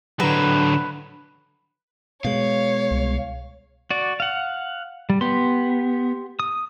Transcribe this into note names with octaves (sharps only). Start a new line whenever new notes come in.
D3 F#3 B4 A#5
B2 G#3 C#5 F5
C2
F#4 D5
F5 F#5
G3
B3 G4 C6
D#6